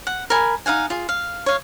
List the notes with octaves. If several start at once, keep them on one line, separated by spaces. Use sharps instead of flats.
F#5
A#4 G#5 B5
D#4 F5 F#5 G#5
F4 G#4
F5
C#5 F5